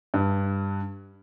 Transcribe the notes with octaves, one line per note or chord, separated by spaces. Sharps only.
G2